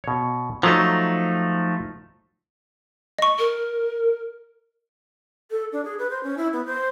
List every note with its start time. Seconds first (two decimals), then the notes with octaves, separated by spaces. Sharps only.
0.04 B2 C#5
0.63 F3 F#3 A3 D#4
3.19 D#5 C#6
3.38 A#4
5.51 A4
5.73 D4
5.85 G#4
5.99 B4
6.10 C5
6.24 C#4
6.38 E4
6.53 B3
6.66 C5